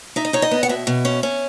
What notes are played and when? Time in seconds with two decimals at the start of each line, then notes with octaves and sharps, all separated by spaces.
0.16 D#4 E5
0.25 D#5
0.33 D#4 C#5
0.42 D#5
0.51 B3
0.63 F#5
0.69 B2 E5
0.87 B2
1.05 C#4
1.23 C#4